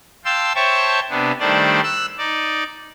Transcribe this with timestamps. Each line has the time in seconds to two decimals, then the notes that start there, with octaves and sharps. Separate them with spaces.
0.25 F5 G5 A5 C6 E6
0.55 C5 C#5 E5 G5 A5 C#6
1.10 C3 B3 D4
1.40 D#3 G3 A3 D4 C5 D5
1.83 E6 F#6
2.18 D#4 D5